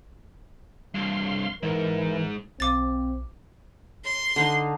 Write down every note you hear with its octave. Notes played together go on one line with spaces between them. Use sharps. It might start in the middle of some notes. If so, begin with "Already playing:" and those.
C2 G2 F5 C6
G#2 E3 A#4
B1 C4 F5 D6 A6
C6
D3 D4 D#4